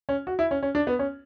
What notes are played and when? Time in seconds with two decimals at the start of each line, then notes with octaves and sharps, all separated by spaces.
0.09 C#4
0.27 F#4
0.39 E4
0.51 C#4
0.63 C#4
0.75 D4
0.87 B3
0.99 C#4